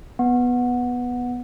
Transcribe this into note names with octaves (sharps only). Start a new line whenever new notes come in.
B3